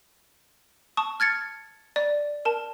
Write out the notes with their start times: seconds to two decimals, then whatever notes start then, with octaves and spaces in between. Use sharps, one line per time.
0.97 A5 C#6 D#6
1.20 F6 G#6 A6 C#7
1.96 D5
2.45 A#4 A5